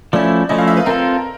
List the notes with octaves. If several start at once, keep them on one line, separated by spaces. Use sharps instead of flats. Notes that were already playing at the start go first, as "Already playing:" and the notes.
F3 A3 C#4 E4 D5
F3 A3 C#4 E4 D#5
F5
E5
B4
C4 F4 A4 A#4